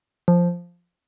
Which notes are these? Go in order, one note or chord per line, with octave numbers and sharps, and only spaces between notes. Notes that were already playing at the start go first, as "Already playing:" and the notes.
F3